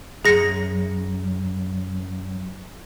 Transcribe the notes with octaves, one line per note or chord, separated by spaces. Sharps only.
C#2 F#2 G#4 A#6 C#7